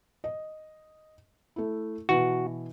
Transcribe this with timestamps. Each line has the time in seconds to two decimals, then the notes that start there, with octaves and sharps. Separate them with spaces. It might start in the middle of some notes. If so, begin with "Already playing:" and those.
0.24 D#5
1.56 A3 E4
2.09 B2 E3 F#4 B4